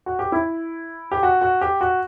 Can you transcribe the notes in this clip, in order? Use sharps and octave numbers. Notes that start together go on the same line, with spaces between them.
F#4
G4
E4
G4
F#4
F#4
G4
F#4